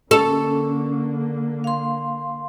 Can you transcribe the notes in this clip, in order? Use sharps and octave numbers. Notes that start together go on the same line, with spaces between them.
D3 A#3 C#4 A4
F5 C6